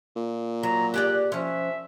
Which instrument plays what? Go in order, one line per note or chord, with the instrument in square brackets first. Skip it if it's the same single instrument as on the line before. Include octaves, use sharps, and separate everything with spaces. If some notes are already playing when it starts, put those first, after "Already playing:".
[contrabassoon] A#2
[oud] F#3 [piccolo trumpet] A#5
[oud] G4 G#4 D5 [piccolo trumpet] F#6
[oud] F3 C#4 [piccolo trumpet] E5